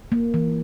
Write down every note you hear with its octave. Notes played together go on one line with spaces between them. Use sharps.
A#3
E3